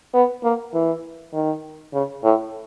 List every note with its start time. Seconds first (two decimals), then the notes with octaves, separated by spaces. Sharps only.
0.14 B3
0.44 A#3
0.74 E3
1.33 D#3
1.94 C#3
2.24 A2